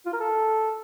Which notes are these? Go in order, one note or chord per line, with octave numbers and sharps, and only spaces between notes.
F4
A#4
A4